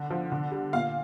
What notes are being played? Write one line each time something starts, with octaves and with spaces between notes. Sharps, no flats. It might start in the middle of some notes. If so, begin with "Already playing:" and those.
Already playing: D3
F3
D3
G3
A#2 F5